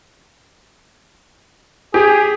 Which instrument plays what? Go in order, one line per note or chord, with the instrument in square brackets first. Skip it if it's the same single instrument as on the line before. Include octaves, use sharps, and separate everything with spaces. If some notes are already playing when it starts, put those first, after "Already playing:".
[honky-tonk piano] G4 [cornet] G#4